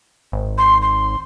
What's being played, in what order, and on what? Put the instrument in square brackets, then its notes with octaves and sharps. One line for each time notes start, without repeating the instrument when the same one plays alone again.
[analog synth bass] G#1
[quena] C6
C6